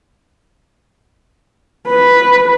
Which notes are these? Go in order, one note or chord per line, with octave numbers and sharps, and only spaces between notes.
B4